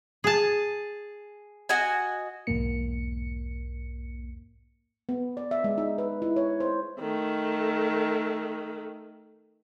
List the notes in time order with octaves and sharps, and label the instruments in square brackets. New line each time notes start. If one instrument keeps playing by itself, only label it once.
[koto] G#4 A5
[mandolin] F#4 D#5 G#5
[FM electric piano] B1 E2 G#2 A#3 C#7
[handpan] B3
D5
E5
G#3
D#4
B4
E4
C#5
C5
[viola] D#3 A3